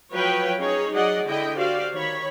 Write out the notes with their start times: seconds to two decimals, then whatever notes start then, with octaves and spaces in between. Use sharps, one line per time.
0.11 F3 F#3 B4 C#5 F5 G5
0.59 C#4 D#4 G#4 C#5
0.94 F#3 G#4 D5 D#5 F#5
1.26 D3 E4 D#5 G5
1.57 F#4 G4 C5 D5 F5
1.92 D#3 C#5 B5